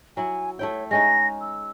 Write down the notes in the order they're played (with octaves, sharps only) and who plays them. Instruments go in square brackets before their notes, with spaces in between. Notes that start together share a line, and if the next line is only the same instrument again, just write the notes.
[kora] F#3 E4 [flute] G#5
[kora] A3 E4 G5 [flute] C#5
[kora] G#3 C#4 D#4 [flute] A#6
[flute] E6